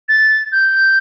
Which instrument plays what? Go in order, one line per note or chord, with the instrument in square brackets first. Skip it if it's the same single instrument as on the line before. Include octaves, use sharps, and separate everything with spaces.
[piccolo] A6
G6